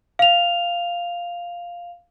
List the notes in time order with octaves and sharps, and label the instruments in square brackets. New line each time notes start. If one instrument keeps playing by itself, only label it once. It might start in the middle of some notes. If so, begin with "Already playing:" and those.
[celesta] F5 F7